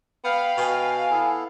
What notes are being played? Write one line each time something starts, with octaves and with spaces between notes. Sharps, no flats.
B3 F5 G5 B5
B2 G#5
B3 E4 A4